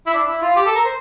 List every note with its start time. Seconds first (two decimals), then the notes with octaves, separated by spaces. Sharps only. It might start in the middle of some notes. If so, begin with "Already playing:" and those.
0.07 E4
0.14 D4
0.27 E4
0.42 F4
0.56 G4
0.66 A4
0.75 A#4
0.85 C5